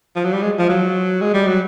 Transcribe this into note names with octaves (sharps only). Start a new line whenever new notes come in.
F3
F#3
G3
G#3
F3
F#3
G#3
G3
F#3